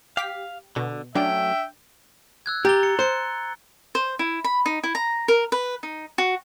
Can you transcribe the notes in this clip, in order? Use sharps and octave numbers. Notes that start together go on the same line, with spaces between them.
G4 F5 B6
B2 D3
F#3 A3 C#4 D4 E5 G5
E6 F#6 G#6
G4 A#5 A6 G7
C#7
C5 F#6 C#7
C5
E4
B5
D#4
E4
A#5
A#4
B4
D#4
F#4